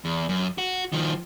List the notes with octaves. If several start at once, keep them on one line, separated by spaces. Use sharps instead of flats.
E2
F#2
F#4
D#3 F3